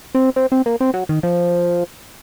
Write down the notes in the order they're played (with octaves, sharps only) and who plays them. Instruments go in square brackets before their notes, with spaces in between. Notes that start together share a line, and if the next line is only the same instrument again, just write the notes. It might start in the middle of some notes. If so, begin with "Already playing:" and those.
[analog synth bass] C4
C4
C4
A#3
C4
F#3
D#3
F3